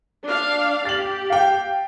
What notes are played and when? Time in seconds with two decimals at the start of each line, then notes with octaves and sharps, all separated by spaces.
0.25 D4 F5
0.85 G4 A6 F#7
1.30 F5 G5